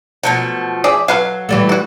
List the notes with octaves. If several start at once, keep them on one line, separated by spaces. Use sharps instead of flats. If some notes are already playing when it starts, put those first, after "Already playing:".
B2 F3 F#3 A3
G#4 D5 E5
F#3 A4 B4 F5
E3 G3 A3
E4 F#4